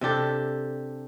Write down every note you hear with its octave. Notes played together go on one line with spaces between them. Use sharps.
C3 D4 G4 A4